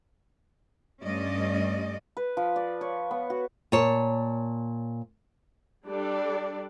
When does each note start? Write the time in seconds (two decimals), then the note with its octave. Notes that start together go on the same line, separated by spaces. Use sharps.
1.02 G2 A3 C#4 D5 D#5
2.17 B4
2.37 F3
2.56 D5
2.81 C#5
3.11 B3
3.30 F#4
3.72 A#2 C#5 A5
5.86 G3 D4 A4 D5